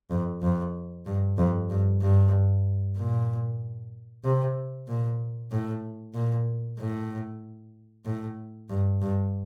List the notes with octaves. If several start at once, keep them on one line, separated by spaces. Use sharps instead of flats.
F2
F2
G2
F2
G2
G2
A#2
C3
A#2
A2
A#2
A2
A2
G2
G2